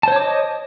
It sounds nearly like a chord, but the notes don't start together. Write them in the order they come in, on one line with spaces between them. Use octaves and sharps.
A5 C5 C#5 D6 D#5